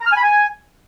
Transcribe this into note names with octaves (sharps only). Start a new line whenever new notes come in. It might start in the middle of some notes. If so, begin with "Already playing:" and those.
A#5
F6
G#5
B5
G#5